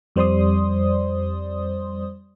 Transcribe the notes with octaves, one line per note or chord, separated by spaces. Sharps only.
F2 G3 C5 D5 C6 D#6